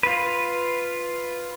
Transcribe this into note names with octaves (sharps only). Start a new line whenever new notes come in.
F4 B4